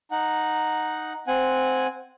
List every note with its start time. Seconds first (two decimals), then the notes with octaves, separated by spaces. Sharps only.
0.11 D#4 F#5
1.27 C4 F#5 G#5